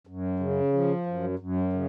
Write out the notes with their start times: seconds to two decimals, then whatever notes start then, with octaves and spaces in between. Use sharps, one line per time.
0.07 F#2
0.40 C#3
0.73 F3
1.06 F#2
1.39 F#2
1.73 C#3